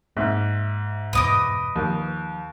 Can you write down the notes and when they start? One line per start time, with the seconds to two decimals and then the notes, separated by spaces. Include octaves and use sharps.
0.17 G#2 A#3 E5
1.13 E1 G2 B3 B4 D#5 D6
1.76 D#2 F3